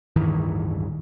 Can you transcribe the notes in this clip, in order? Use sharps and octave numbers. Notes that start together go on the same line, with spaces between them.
D1 G2 D#3 E3